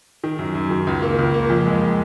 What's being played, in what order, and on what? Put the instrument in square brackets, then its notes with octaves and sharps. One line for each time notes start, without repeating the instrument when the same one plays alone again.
[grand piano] D#3
F#2
F#2
D#3
C#2
A#3
C#2
A#3
F2
G#3